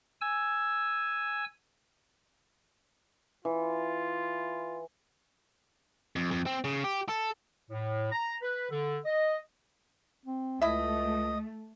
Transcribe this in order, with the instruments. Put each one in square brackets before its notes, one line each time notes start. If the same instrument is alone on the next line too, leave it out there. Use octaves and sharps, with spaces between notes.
[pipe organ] G#5 E6
[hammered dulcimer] E3 [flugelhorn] F4
[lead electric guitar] F2
F2
C4
C#3
G4
A4
[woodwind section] A2
A#5
B4
D3
D#5
[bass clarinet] C4
[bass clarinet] C#2 [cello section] A3 [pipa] E4 E5 [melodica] D#5